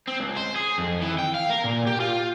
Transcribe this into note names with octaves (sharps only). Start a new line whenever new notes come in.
C4
C#2
C5
G#4
F2
E3
G5
F5
A#4
A#2
G4
F4